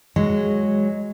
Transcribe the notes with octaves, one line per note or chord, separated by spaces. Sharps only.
F#3 G#3